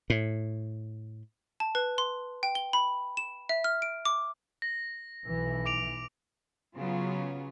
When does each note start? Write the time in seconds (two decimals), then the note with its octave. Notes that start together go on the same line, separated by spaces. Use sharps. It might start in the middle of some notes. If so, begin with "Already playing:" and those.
0.10 A2
1.60 A5
1.75 B4
1.98 C6
2.43 G5
2.55 G7
2.73 B5
3.17 E7
3.49 E5
3.64 F6
3.82 D7
4.05 D6
4.62 A#6
5.26 B1 E3
5.66 D6 D7 F7
6.77 C#3 F#3 B3 C#4 F4